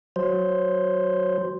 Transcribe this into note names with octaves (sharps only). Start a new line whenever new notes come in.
F#3 C5